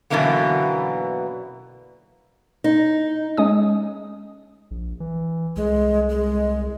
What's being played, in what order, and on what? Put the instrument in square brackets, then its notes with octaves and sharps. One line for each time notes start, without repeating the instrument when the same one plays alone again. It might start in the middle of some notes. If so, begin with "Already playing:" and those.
[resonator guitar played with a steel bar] F#2 B2 D3 E3 A#3 B3
[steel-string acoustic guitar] D#4
[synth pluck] G#3 C#4 D#6
[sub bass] A#1
E3
[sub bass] C2 [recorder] G#3
[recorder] G#3